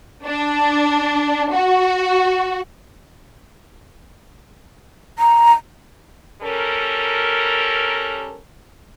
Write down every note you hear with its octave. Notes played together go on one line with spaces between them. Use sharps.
D4
F#4
A#5
G3 C#4 A4 A#4